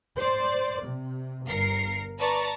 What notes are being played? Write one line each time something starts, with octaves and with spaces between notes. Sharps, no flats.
C5 D5
C3
G1 A#4 C7 C#7
B4 D5 A5 A#5 C#6